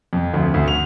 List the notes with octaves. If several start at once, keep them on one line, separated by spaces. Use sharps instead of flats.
F2
D2
D2
F7